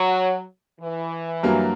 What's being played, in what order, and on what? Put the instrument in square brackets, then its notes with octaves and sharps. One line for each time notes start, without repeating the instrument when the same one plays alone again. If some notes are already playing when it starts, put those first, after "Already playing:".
Already playing: [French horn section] F#3
E3
[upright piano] G2 F#3 A#3